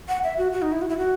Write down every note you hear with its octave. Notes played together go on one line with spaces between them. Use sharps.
F#5
E5
F#4
F#4
D#4
E4
F#4
E4
F#4